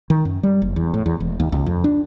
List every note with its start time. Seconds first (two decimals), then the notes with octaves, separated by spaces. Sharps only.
0.10 D#3
0.25 F#2
0.43 G3
0.62 F#1
0.76 E2
0.94 A2
1.06 E2
1.20 E1
1.40 D#2
1.52 C#2
1.66 F2
1.84 D4